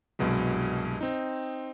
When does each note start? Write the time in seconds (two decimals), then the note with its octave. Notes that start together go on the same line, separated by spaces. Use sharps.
0.19 C2 G2 B2 F#3 G#3
1.01 C4 D#4